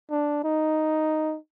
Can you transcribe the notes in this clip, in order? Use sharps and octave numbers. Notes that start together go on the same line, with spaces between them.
D4
D#4